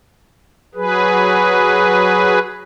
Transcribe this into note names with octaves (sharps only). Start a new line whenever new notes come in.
F#3 G#4 B4